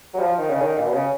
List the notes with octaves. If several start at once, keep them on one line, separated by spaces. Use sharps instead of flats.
F#3
F3
D#3
C#3
D#3
A#2
B2
C#3